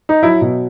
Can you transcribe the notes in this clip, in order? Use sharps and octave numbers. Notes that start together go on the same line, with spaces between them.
D#4
F#3 E4
B2